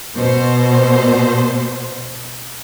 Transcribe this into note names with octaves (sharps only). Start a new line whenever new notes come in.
B2 C5